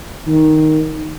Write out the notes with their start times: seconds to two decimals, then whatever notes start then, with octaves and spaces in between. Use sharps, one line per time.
0.27 D#3